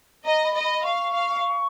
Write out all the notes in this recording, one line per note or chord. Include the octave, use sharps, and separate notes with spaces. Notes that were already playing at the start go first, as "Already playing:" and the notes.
D#5 A#5
B5
D#5
B5
F5 C#6
F5